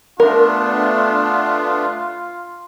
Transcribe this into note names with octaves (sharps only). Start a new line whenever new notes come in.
A3 B3 D4 F4 A#4